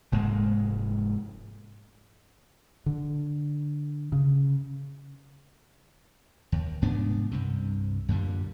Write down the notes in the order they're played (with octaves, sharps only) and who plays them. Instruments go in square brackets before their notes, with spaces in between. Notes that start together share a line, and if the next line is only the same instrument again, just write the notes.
[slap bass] F1 G#2 G#3 A#3
[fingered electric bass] D3
C#3
[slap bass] D#2
F1 G#2 B3 D4
C2 G2 C3
F#2 A#2 D3 G3